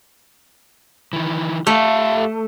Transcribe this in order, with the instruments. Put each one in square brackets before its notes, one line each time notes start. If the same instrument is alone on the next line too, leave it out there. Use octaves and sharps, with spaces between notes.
[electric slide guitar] D#3 E3
[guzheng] A3 [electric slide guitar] G4 E5 F5